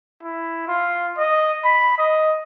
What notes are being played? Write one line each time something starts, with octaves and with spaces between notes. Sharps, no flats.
E4
F4
D#5
B5
D#5